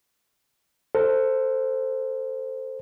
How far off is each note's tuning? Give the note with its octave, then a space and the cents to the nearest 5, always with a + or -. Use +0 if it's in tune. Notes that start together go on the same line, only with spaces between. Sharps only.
A4 +20 C5 +0